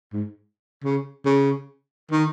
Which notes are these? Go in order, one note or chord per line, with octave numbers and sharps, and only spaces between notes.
G#2
C#3
C#3
D#3